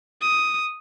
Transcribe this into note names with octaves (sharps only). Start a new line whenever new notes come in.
D#6